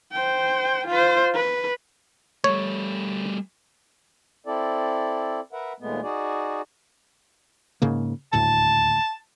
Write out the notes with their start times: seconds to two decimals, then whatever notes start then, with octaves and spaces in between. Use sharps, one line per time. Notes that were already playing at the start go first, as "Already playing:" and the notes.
0.12 C5 G5
0.87 F4 C5
1.35 B4
2.44 G3 A3 C#5
4.46 C4 E4 A4 D5
5.53 A#4 B4 E5 F#5
5.80 D#2 A#2 G#3 A3 B3
6.03 D#4 F#4 G#4 D5
7.82 G#2 C#3 A#3
8.33 D#1 D2 A2 A5